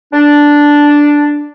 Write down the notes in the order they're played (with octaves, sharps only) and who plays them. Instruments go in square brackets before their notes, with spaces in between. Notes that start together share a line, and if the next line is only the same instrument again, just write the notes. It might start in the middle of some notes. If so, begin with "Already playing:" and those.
[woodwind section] D4